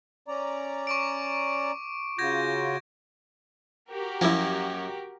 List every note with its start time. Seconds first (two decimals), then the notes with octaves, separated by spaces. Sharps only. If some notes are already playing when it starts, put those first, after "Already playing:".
0.28 C#4 D5 A#5
0.87 C#6 D6 D7
2.18 C#3 F4 F#4 G6 G#6 A#6
3.90 F#4 G4 A#4
4.21 F#2 F3 A#3 C#4 E4